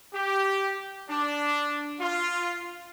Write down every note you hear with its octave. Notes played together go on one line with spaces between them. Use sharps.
G4
D4
F4